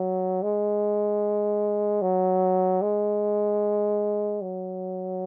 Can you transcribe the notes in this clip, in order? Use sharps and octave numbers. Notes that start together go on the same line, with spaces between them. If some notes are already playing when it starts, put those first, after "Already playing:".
Already playing: F#3
G#3
F#3
G#3
F#3